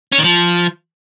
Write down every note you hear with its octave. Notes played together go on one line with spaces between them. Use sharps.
C#4
D#3
F3